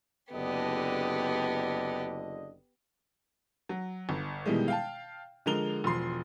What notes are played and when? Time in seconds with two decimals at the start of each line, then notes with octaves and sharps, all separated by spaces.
0.32 F#1 D3 B3 G4 D#5
3.69 F#3
4.09 G1
4.46 B2 D#3 E3 G3 G#3
4.68 F5 G5 A5
5.46 D3 F3 G#3 A#4 F7 G7
5.84 E1 F3 C6 C7